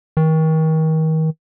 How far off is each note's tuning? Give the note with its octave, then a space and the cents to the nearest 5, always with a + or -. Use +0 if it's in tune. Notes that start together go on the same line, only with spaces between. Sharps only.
D#3 +35